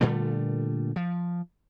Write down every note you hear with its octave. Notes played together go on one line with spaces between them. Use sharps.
A#2 D3 G3 A3
F3